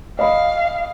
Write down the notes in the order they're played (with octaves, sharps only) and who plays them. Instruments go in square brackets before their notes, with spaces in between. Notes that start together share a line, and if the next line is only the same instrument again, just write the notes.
[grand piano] D#5 B5 [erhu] F5